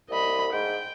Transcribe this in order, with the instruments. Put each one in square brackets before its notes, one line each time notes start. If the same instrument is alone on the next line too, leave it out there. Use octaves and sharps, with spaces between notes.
[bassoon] C2 [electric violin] D#5 B5
[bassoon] G#2 [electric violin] G5